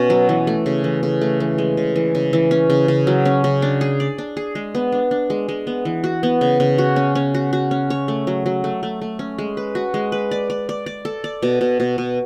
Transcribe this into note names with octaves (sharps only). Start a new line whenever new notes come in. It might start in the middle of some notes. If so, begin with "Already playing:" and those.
Already playing: B2 C#4
F#3
E3
A3
C#3
E3
C#3
A3
E3
G#3
C#3
E3
C#3
E3
C#4
C#3
C#3
F#3
C#4
C#3
D4
G#4
D5
D4
G#4
G#3
B3
D4
D4
G#3
G#3
B3
E3
F#4
B3
C#3
C#3
F#4
C#4
C#4
F#4
F#4
C#4
C#5
A3
F#3
F#3
A3
A3
A3
C#4
G#3
B4
F#4
G#3
B4
D5
D5
D5
D5
A4
D5
B2
B2
B2
B2